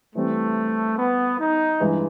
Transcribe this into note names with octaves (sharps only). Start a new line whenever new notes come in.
E3 G3 A3 C4
B3
D#4
G2 E3 G#3